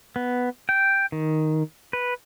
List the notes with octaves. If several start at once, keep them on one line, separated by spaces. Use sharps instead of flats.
B3
G5
D#3
B4